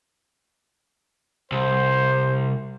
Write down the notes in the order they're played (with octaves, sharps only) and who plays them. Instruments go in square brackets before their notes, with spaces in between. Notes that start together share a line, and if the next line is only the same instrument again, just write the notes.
[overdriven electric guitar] C2 [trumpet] C5